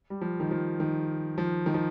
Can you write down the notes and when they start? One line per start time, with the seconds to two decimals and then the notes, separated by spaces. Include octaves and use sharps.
0.10 G3
0.21 F3
0.40 D#3
0.51 F3
0.80 D#3
1.38 F3
1.66 D#3
1.74 F3